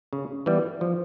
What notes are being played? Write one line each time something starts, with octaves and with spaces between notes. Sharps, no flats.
C#3
E3 G3 B3
F3